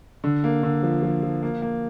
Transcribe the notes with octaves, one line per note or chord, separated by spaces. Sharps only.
D3
A#3
D3
F3
F3
F3
A#3
A#3